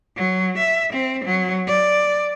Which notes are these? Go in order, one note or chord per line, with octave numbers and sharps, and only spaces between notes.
F#3
E5
C4
F#3
D5